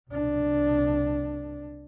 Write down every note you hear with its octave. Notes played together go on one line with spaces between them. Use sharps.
C2 D4